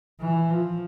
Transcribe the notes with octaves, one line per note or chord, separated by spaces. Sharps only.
E3
F3